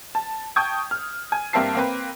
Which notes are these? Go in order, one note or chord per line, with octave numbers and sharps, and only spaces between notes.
A5
G5 A5 C#6 D#6 G6 G#6
F6
G#5
G2 A#3 C4 E5 A5 C7
A#3 C4 B4